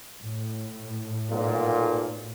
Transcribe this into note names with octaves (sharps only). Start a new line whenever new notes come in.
A2
B1 A#2